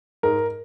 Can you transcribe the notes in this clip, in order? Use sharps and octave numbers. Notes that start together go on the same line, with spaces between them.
G#2 A#4